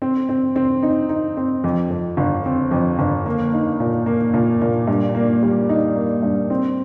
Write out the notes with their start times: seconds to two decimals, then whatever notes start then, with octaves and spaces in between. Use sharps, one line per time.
0.02 C4
0.29 C4
0.56 C4
0.83 D#4
1.09 D#4
1.37 C4
1.64 F2
1.90 F2
2.17 G1
2.45 C4
2.71 F2
2.99 G1
3.26 A#3
3.54 D#4
3.80 A#2
4.06 A#3
4.34 A#2
4.61 A#2
4.87 G2
5.15 A#3
5.43 G3
5.69 D#4
5.96 A#3
6.23 G2
6.50 C4